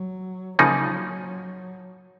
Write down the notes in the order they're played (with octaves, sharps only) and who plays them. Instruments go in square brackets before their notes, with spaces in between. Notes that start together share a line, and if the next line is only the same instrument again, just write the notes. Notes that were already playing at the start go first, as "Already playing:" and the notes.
Already playing: [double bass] F#3
[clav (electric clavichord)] C#3 F3 A#3 D#4 [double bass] F#3